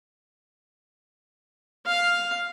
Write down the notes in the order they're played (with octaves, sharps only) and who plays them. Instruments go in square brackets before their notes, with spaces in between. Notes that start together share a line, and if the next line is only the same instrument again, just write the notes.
[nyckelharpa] F5